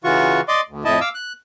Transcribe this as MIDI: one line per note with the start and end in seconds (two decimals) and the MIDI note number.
0.04 0.41 49
0.04 0.41 52
0.04 0.41 65
0.04 0.41 66
0.04 0.41 85
0.48 0.61 74
0.48 0.61 75
0.48 0.61 84
0.48 0.61 86
0.69 0.84 38
0.85 1.00 41
0.85 1.00 45
0.85 1.00 64
0.85 1.00 75
0.85 1.00 81
1.01 1.09 77
1.01 1.09 86
1.01 1.09 88
1.15 1.33 90